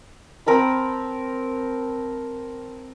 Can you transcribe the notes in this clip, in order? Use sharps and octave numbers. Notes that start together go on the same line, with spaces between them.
C4 A#4 A5 B5